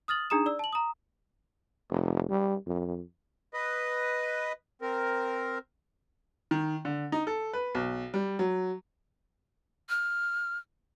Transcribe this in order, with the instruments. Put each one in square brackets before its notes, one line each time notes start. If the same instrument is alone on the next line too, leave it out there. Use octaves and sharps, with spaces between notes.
[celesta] D#6 F6 A6 F#7
D4 D#4 G#4 A#5 D#6 E7
D5 E6
A5 F#7
A#5 D#6
[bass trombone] F1
G3
F2
[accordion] B4 D#5
C4 A#4
[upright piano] D#3
D3
D#4
A4
B4
B1
G3
F#3
[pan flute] F6